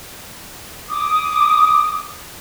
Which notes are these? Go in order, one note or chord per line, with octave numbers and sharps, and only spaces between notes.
D6 D#6